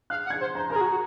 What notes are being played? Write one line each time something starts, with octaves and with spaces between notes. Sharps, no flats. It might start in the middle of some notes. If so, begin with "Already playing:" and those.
F5 F#6
F#5
G#6
C5
C5 A#5
A#4 A#5
G#4
F#4
F#4